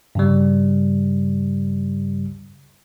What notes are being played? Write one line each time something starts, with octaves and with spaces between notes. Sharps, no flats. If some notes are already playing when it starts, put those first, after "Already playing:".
G2 C#3 G3